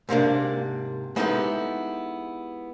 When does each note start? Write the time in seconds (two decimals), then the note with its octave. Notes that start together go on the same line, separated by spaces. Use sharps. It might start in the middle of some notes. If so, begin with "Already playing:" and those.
0.09 G#2 C3 A#3 D4
1.16 G#3 B3 D#4 E4 G4 A4